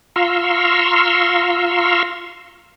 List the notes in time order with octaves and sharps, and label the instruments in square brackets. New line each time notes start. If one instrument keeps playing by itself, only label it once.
[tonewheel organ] F4 F5 A#5 C6 C#6 E6